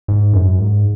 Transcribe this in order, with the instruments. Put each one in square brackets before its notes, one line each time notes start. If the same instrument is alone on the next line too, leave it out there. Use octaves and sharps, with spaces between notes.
[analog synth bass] G#2
F#2
G#2